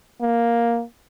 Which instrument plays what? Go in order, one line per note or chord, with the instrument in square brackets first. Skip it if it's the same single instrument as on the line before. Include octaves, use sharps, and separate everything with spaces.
[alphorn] A#3